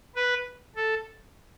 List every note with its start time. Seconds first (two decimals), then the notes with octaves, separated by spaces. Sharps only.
0.16 B4
0.76 A4